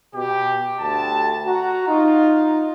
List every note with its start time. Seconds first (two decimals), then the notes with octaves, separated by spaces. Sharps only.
0.14 B2 G4
0.79 D2 G4 A5
1.46 F#4 A#5
1.88 D#4 F4